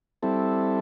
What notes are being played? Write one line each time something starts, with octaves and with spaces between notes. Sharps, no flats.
G3 C4 E4 A4